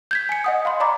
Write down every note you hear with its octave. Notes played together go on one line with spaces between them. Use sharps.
G6 G#6 B6
G#5 C#7
D#5 F#5 D#6
F5 B5 C6
D5 A#5 B5 D6